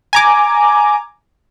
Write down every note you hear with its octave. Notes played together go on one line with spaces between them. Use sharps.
G#5 A#5 D6